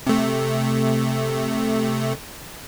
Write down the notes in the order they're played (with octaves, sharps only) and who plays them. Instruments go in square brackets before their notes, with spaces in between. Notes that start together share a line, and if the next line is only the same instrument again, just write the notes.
[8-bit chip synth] C3 A3